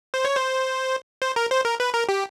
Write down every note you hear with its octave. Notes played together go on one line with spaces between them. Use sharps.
C5
C#5
C5
C5
A#4
C5
A#4
B4
A#4
G4